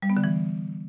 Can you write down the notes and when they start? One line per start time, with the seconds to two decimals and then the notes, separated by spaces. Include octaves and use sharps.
0.02 G3
0.10 B3
0.17 D3
0.24 E3